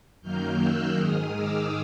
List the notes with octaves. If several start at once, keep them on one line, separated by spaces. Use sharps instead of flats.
F#2 D#3 F#3 A#3 F6 G6
E6 F#6
G#2 D#3 G#3 D#6 F6
D6 E6